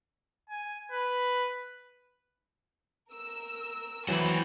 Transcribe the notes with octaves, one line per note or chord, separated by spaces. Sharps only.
G#5
B4
A#4 E6
E2 E3 F#3 F#4 C5 G5 G#5 B5